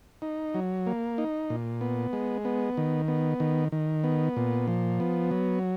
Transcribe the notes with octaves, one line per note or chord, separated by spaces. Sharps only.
D#4
F#3
A#3
D#4
A#2
B3
G#3
B3
D#3
B3
D#3
D#3
B3
A#2
F3
B3
F#3